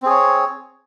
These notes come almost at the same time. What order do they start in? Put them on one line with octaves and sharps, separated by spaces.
C4 G#4 C#5